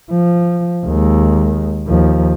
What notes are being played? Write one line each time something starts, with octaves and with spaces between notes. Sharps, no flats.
F3
D#2 G#3
D#2 F3